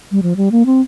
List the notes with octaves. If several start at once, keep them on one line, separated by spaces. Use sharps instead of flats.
G3
F3
G3
A#3
C4